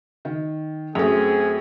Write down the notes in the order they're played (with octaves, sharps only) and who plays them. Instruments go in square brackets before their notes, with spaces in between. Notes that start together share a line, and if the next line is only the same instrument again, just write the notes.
[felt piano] D#3
[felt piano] F#2 A3 [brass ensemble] C4 G#4